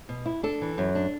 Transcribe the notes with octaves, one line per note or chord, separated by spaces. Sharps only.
B2
E4
D4 A4
E3
F#2
D4